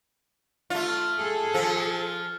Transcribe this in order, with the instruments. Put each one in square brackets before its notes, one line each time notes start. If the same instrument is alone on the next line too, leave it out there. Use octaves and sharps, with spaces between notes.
[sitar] A3 F4
[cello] G#4 A4
[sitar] F3